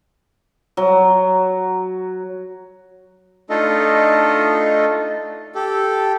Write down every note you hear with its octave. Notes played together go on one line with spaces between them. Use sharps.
F#3
A3 D4 D#4 F4 A4 D#5
G4 A4